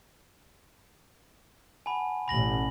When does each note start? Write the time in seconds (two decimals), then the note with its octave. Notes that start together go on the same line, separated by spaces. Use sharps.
1.86 F#5 G#5 A5 B5
2.28 A1 B2 B5 A#6 F#7